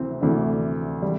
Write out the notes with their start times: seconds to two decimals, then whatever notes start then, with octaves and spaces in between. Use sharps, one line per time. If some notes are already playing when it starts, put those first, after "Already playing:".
Already playing: D2 C3 E3 C4
0.20 D2 C3 E3 D4
1.02 G3